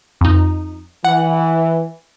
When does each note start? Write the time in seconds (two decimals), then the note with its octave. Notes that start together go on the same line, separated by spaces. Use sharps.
0.21 F2 D#4
1.05 E3 F#5